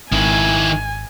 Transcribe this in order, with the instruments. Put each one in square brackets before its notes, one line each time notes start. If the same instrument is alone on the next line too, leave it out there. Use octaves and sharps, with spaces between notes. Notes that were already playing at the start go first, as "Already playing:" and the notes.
[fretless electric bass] G#1 [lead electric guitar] D#3 E4 [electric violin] G#5